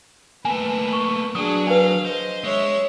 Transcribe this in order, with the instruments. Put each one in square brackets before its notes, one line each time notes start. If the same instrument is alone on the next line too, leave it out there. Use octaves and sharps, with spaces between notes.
[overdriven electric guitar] A3 A#3 [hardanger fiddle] B4 [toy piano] G#5
[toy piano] C#6
[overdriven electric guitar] F#3 [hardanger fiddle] D4 G#4 [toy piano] D#6
[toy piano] D4 B4 [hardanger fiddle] F5
[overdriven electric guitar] C5 [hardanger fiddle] D#5
[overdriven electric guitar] G#3 [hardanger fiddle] C#5 E5